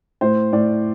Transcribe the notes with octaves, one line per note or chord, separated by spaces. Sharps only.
A2 C5
A2 D5